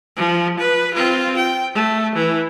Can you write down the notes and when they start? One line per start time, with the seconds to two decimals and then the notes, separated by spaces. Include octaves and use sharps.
0.16 F3
0.59 B4
0.94 C4 F4
1.36 G5
1.75 A3
2.15 E3